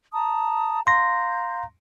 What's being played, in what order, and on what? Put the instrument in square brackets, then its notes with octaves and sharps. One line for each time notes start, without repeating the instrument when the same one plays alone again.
[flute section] A5 A#5 D#6
[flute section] F5 A#5 G6 [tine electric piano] C6 A#6